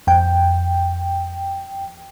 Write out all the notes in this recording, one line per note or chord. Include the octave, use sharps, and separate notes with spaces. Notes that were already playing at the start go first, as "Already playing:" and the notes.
F2 G5